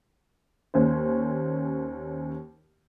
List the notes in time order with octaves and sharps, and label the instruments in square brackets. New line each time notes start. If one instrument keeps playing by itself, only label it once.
[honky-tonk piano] D#2 C#4 C5